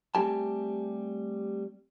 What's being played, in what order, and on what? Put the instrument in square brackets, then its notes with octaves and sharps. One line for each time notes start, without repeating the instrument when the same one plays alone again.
[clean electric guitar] G3 A3 C4 G4 G#5 A5